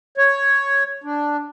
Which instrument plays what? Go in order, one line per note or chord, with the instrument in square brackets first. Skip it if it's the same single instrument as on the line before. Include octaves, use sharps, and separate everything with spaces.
[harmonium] C#5
D4